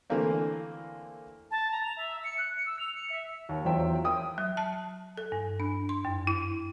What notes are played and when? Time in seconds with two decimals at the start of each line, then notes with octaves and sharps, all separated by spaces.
0.10 D3 E3 A3 A#3 C4
1.51 A5
1.72 A#5
1.85 F7
1.97 E5
2.24 C#7
2.38 F#6
2.54 C#7
2.66 E6
2.79 F7
2.95 C#7
3.10 E5
3.49 D#2
3.65 E2 F#3 F4 C5 E5 G5
4.04 G5 D#6
4.38 F#3
4.57 A5
5.18 A4
5.32 G2
5.60 D4
5.89 C6
6.05 F#2
6.27 E4